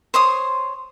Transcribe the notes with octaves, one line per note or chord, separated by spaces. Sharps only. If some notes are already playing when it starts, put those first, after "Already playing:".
C5 C#5 C6 D#6